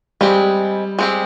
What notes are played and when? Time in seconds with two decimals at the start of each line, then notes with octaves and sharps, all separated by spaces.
0.21 G3 G#3 C4 G4
0.99 G#3 C4 G4